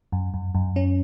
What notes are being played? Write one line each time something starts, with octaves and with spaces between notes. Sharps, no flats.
F#2
F#2
F#2
C#4